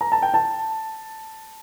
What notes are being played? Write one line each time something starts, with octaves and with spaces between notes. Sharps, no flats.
A#5
A5
G5
A5